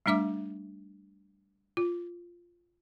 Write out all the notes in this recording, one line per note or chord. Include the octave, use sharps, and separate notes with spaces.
G3 A3 D4 E5 D6
F4